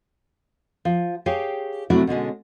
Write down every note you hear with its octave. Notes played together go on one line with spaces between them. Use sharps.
F3
G4 G#4 C#5 F5 G5
C3 F#3 A3 D4 E4 F#4
B2 D3 G#3 C#4